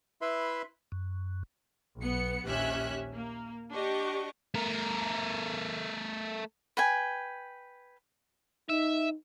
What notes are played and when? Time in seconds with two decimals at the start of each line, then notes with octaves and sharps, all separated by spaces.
0.21 E4 B4 E5 B5 C6
0.92 F#2
1.99 B1 B3 C#7
2.47 A#1 D#2 C#4 G4 E5 F#6
3.14 A#3
3.73 D4 G4 D#5 C#6 D6
4.54 A3 A#4
6.77 B4 G5 G#5
8.69 D#4 E5